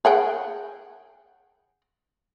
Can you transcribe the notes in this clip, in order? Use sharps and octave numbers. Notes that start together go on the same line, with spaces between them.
G#4 F#5 G5